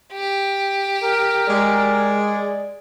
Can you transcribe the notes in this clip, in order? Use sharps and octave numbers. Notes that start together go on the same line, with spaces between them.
G4
A#4
G#3 D5